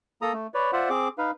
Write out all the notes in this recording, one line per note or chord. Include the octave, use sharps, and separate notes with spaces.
A#3 A4 A#5 D#6
A3
B4 C#5 D5
F4 C5 D5 E5 F#5
C4 G#4 D6
D#4 B4 F5